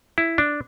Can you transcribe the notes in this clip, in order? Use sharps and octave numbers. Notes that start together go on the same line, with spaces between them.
E4
D4